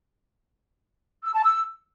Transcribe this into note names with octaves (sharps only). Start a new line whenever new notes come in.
E6
A5
E6